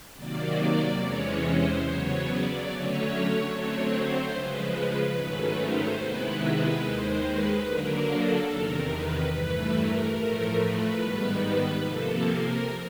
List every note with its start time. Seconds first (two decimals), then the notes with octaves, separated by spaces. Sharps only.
0.16 C3 D#3 F#3 A#3 D5
0.99 E2 C3 E3 G#3 C#4 C#5
1.41 C5
1.82 C#3 F#3 B3 C#5
2.24 D5
2.66 D3 F#3 A3 C#4 C#5
3.49 D3 F#3 A3 C4 C#5
3.90 C5
4.32 C#3 F3 G#3 B4
4.73 B4
5.15 G#2 D#3 F#3 A3 C#4 B4
5.57 C5
5.98 C3 D#3 G#3 B3 E4 B4
6.40 B4
6.81 D#2 D#3 G#3 C5
7.23 B4
7.64 D3 F#3 A#3 D4 A#4
8.06 A4
8.48 E2 C3 D#3 A#4
8.89 B4
9.31 G2 E3 A3 B4
9.73 A#4
10.14 A2 F3 A3 A#4
10.55 B4
10.97 G#2 D#3 G3 B3
11.39 B4
11.80 C3 F3 A#3 A4
12.22 A#4